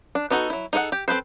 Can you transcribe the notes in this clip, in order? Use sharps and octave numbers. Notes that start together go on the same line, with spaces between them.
D4
B3 D4 D#4 F#4 A4
F#3 E4
D#4 G#4 A4 C5 F#5
G4
C4 A4 B4 C5